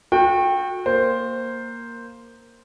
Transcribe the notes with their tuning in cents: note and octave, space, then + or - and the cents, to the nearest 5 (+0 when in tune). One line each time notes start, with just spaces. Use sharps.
F#4 -30 A4 +0 G5 +10
A#3 +0 C5 +0